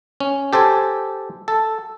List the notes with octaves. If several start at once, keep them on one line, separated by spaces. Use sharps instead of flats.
C#4
G4 A4 C5 G5 G#5
A4